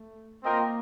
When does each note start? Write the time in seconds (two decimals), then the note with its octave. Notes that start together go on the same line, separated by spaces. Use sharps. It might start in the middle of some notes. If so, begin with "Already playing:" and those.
Already playing: A3
0.43 A#3 C4 F4 A#4 D#5 G5